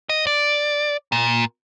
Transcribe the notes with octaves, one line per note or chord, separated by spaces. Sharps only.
D#5
D5
A#2